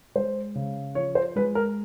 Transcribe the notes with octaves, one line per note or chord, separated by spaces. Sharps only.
G#3 C5
C#3
F3 C#5
C5
G#3 B4
A#4